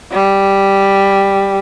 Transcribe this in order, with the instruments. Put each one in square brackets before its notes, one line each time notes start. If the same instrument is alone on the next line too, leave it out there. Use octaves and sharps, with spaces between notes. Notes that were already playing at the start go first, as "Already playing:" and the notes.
[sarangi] G3